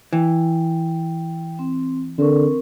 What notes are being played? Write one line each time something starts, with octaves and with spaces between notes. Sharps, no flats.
E3 G5
C4
D3 C4 A#4 C#6